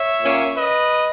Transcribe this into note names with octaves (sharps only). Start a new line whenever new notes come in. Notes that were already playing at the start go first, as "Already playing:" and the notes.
Already playing: C#5 E5
A#2 A#3 C#4
B4 D#5